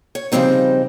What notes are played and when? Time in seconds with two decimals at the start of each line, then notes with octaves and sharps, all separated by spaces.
0.15 C#5
0.32 C#3 F3 G3 C4 D#4